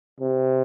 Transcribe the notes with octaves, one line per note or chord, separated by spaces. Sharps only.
C3